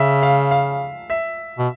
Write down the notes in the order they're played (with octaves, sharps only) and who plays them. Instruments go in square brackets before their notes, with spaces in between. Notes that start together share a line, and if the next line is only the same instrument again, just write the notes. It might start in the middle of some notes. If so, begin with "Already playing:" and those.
Already playing: [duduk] C#3 [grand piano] E5
[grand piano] F5
F5
E5
[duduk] B2